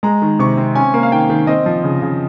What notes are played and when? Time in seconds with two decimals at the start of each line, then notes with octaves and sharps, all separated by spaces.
0.03 G#3 A#5
0.22 D#3
0.39 C3 C#6
0.57 C4
0.76 C#4 G#5
0.94 A#3
1.03 F5
1.12 D#3 G5
1.30 D#3
1.47 C4 D#5
1.66 F3
1.84 C#3
2.02 C#3